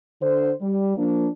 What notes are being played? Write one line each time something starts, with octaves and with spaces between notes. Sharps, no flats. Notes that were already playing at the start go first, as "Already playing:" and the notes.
D3 C5
G3
F3 A#3 D4